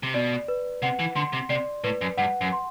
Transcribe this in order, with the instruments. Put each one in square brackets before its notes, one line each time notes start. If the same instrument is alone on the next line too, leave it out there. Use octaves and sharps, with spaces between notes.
[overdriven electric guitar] C3
[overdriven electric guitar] B2 [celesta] D5
[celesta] B4
[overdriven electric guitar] C3 [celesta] F#5
[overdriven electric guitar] E3
[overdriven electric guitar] D3 [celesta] C6
[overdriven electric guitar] C3
[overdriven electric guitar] C3 [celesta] D5
[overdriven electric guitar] A2 [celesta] B4
[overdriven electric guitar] F#2
[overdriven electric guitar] G2 [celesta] F#5
[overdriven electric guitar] F#2
[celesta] C6